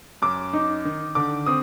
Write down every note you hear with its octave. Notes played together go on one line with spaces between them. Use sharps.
F#2 D6
D#4
D#3
D3 D6
C4 D#6